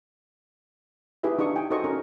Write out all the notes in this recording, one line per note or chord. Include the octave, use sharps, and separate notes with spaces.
D#4 E4 G4 G#4 B4 E5
D4 D#4 G#4 C#6 D#6
G5 G#5
D#4 F#4 A4 C5 D#5 C#6
C#4 A#4